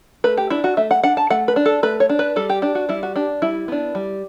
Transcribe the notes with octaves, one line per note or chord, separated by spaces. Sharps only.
A3 B4
G4
D4 E4
F#4
A3 E5
F#5
D4 F#5
A5
A3 F#5
B4
D4
A4
A3 B4
C#5
D4
B4
G3 A4
G4
D4 G4
F#4
G3 E4
F#4
D4 G4
G3 E4
B3 D4
G3